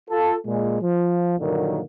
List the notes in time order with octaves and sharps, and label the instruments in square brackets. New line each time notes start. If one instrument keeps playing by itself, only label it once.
[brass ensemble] F4 A4
A#2 G#3
F3
G2 A#2 D3 D#3 F#3 A#3